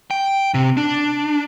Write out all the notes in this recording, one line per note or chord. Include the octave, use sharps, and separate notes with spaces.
G5
C3
D4